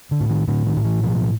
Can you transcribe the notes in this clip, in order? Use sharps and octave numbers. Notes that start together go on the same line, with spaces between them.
D3
A2
D#3
A2 D3
D#3
A2
E3
B2 F3